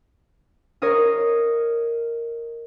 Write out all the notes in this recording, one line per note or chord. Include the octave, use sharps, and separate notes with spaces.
A#4 C#5 D#5 F5